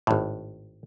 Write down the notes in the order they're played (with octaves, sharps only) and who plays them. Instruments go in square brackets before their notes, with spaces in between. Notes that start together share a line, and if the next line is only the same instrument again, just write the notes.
[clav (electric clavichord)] G#1 A2